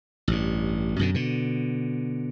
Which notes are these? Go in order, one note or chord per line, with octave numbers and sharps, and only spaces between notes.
A1 G2
F#2 B2 D3
B2 D3